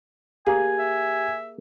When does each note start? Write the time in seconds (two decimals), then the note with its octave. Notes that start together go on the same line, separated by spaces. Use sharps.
0.47 A#3 G4 G#4 G#5
0.79 E5